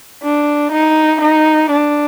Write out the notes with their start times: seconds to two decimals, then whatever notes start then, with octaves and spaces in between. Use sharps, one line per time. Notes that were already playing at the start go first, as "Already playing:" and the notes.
0.23 D4
0.72 D#4
1.21 D#4
1.71 D4